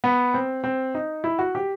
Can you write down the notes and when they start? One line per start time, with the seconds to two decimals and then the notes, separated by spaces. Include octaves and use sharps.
0.04 B3
0.34 C4
0.64 C4
0.94 D#4
1.24 E4
1.39 F#4
1.55 G4